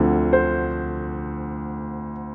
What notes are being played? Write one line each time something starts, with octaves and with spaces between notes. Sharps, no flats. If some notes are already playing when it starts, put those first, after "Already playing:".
Already playing: D2 D3 F3 C4
C5